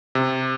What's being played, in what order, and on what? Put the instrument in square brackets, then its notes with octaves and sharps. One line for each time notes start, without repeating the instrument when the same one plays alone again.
[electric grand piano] C3